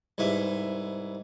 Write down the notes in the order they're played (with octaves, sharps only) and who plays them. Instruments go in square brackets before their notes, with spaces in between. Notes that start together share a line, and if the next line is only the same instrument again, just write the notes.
[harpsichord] C2 G#2 B4 E5